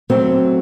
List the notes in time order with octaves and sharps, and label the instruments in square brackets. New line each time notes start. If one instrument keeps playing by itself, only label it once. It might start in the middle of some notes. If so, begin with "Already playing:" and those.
[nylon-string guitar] F#3 A3 C4